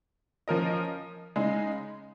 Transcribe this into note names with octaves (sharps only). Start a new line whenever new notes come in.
F3 C#4 A#4 D#5
C#3 G#3 D#4